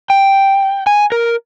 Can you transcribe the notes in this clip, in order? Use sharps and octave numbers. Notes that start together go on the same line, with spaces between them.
G5
G#5
A#4